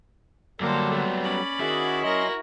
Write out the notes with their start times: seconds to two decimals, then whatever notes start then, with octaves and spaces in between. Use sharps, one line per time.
0.60 F#2 D3 F#3 G3 A#3 A4 C5
0.92 A3 B3
1.24 C#4 D5 B5
1.60 D#3 E4 F#4 G#4
2.03 F#3 F#4 A#4 D#5 C6